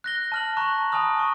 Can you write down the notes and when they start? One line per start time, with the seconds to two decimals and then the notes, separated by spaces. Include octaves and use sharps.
0.04 F#6 A#6 G7
0.32 A5 F6 F#7
0.57 A5 A#5 C#6 F#6
0.92 G#5 A5 B5 D#6 F6
1.17 A5 C#6 F6